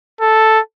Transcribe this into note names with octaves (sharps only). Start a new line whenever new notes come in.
A4